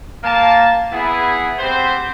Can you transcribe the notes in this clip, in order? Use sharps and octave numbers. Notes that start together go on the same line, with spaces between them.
A#3 A5
B3 E4 G#4
B3 C4 G4 C5